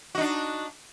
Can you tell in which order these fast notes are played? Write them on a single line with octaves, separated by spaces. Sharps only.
F#4 D#4 D4